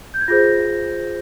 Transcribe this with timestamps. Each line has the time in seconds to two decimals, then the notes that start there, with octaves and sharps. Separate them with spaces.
0.14 G6
0.21 G#6
0.28 F4 G#4 C5 G6 A#6